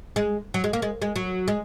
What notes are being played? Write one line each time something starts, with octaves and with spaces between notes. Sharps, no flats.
G#3
F#3
G#3
A#3
G#3
G#3
F#3
G#3